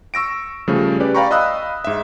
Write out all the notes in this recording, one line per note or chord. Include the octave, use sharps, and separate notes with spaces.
C#6 E6 A#6 D7
C#3 F3 G3 A3
C#4 G4 B4 D5
D5 F5 G5 A#5 B5 C#6
D#5 F5 B5 D#6 E6 F#6
G#2 E5